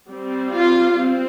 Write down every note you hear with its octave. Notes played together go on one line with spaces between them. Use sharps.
G3 C4
F4
C4